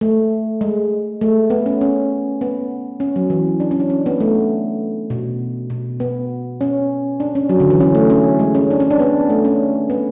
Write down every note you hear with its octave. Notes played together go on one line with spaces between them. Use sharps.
A3
G#3
A3
B3
C#4
C#4
B3
C#4
F#3
E3
D4
C#4
D4
C#4
B3
A3
B2
B2
B3
C#4
D4
C#4
F#3
D3
E3
C#4
A3
C#4
G#3
C#4
D4
C#4
D4
B3
A3
C#4
B3